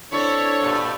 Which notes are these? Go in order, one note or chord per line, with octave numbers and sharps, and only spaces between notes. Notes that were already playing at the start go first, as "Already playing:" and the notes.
C4 D4 E4 A4 C#5
G2 A#2